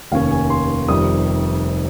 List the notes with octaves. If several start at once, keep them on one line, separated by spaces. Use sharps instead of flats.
F1 D#2 D#3 A#3 C#4 F5
G#5
C6
F1 F2 C3 D#3 G3 D#6